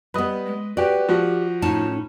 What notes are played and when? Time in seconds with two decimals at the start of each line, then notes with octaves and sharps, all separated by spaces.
0.14 G3 B3 B4 D#5
0.46 G#3
0.77 F#4 G4 B4 D5
1.08 F3 F#4 G4
1.62 A2 C#4 D#4 A5